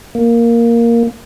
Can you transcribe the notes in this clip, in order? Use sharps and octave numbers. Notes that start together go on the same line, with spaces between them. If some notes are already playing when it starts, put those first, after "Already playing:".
A#3